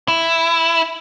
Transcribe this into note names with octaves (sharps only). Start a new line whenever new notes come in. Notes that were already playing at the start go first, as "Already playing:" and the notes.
E4